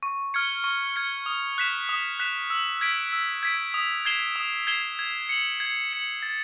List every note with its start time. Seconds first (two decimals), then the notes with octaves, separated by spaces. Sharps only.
0.03 C#6
0.34 F6 G#6 C#7
0.64 C#6
0.96 F6 G#6 C#7
1.26 D#6
1.58 F#6 B6 E7
1.89 D#6
2.19 F#6 B6 E7
2.50 E6
2.81 G#6 B6 D7
3.13 E6
3.43 G#6 B6 D7
3.74 D#6
4.05 G#6 C7 E7 G7
4.36 D#6
4.67 G#6 C7 E7 G7
4.99 G#6
5.29 C#7 F#7
5.60 G#6
5.91 C#7 F#7
6.23 A6